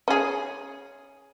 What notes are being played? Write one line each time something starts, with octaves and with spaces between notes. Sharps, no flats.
C#4 G#4